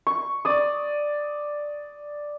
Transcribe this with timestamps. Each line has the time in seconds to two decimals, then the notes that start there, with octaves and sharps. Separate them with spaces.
0.07 C#6
0.45 D5 D#6